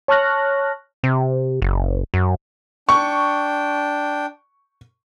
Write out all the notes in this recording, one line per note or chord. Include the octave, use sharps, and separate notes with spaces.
C#5 A5 C#6 F6 F#6 A#6
C3
F#1
F#2
D4 G5 C#6